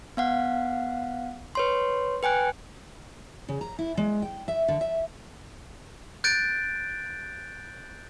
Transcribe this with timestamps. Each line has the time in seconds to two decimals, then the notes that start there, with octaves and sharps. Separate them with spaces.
0.17 B3 F5 F#5
1.55 B4 C#5 C6
2.23 B4 G5 G#5 F#6
3.49 C#3
3.61 A#5
3.79 E4
3.97 G#3
4.22 G5
4.48 E5
4.68 D3
4.81 E5
6.24 F#6 G6 A6 D7